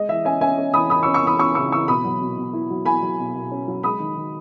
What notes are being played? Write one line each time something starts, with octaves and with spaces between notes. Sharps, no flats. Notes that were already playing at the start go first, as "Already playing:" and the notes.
Already playing: G#3 D#5
E3 E5
C#4 E5 G#5
C#4 E5 G#5
C#4
E3 B5 D#6
E3 B5 D#6
C#4 C#6 E6
C#6 E6
E3 B5 D#6
C#4 C#6 E6
C#3 C#6 E6
E3 C#6 E6
B2 B5 D#6
F#3
B2
B2
E4
F#3
E4 G#5 B5
F#3
B2
B2
C#4
F#3
G#3 B5 D#6
D#3
D#3